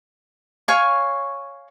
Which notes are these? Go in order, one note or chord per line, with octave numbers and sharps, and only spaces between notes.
C#5 F5 G#5 C#6